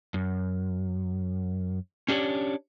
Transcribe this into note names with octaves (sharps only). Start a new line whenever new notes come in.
F#2
C#4 D4 G4 C#5 D5